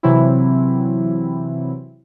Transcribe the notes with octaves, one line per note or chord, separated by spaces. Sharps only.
C3 E3 F#3 C4 E4